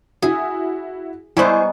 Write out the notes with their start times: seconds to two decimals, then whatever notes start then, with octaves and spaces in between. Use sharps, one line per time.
0.22 E4 F#4 G#4
1.37 G3 G#3 B3 D#4 E4 C5 G#5 C#6